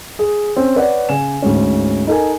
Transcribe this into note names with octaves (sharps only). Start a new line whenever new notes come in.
G#4
C4 C#4
B4 C#5 D5 F#5
C#3 G#5 E7
D2 G#2 C#4
D#4 A4 A#4 G#5